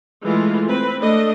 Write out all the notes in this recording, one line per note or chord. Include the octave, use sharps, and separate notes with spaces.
E3 G#3 A3 F4
C4 B4
A3 D4 D#5